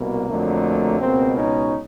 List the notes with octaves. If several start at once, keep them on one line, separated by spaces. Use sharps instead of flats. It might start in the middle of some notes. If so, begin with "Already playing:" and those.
Already playing: C2 B2 A#3
F2 D3 F#3 A3
C#2 B2 G#3 A#3 C4
C#4 D#4